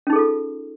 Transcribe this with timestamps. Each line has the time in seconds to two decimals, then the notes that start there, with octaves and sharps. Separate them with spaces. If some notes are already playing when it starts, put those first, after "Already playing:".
0.07 C#4
0.10 D#4
0.13 G#4
0.16 A4
0.19 F4